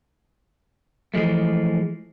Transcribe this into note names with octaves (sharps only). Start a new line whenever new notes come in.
E3 F3 G#3 A3